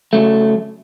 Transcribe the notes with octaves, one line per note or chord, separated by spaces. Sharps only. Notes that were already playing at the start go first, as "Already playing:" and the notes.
C#3 F#3 A3